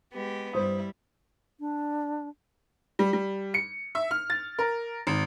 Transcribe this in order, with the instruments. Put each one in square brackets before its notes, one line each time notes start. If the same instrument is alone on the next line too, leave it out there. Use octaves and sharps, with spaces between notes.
[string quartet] G#3 B3 G4
[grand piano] G2 C5 D#6 [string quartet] G3 E4
[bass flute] D4
[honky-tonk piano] G3
G3
C#7
E5
F6
A6
A#4
G#1